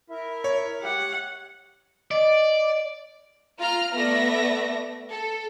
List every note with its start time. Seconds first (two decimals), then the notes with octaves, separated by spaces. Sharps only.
0.10 E4 A#4 E5
0.44 C#5
0.83 G4 F#5
2.11 D5 D#5
3.59 F4 A#5 F6
3.94 A3 B3 D5 E5 A#6
5.10 A4